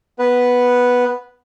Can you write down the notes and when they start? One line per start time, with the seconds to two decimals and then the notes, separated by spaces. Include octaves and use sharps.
0.19 B3 B4